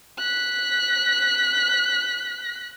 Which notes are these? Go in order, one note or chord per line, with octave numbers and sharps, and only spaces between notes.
F#6 B6